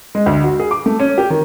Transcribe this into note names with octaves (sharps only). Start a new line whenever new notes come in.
G#3
D2
F#4
G#4
D6
A3
C#4
G4
D#3